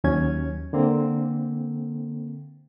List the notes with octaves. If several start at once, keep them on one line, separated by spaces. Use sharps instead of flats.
D#2 F#3 C#4 G#6
D3 A#3 C4